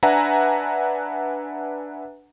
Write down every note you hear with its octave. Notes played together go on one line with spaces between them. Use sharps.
D4 B4 E5 F#5 G#5 A#5